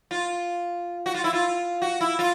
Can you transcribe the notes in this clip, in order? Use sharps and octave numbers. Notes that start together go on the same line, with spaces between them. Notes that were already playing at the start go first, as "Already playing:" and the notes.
F4
F#4
F4
E4
F4
F#4
E4
F4